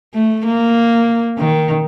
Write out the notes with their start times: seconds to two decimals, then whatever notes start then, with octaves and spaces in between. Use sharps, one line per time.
0.15 A3
0.46 A#3
1.39 D#3